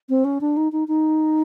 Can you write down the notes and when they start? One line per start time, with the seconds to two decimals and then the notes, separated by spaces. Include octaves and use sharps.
0.09 C4
0.24 C#4
0.41 D4
0.57 D#4
0.72 D#4
0.88 D#4